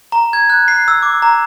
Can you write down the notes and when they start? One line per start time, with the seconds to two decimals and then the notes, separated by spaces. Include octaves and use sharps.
0.12 A#5
0.33 G#6
0.50 F#6
0.68 C7
0.88 E6
1.03 D6
1.22 A#5